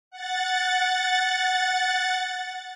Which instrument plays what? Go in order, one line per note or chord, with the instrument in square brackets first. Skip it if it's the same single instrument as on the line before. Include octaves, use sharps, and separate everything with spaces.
[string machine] F#5 A6